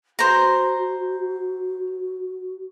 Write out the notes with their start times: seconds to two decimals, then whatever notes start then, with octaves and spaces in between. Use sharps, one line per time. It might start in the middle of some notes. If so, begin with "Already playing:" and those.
0.19 F#4 C5 A#5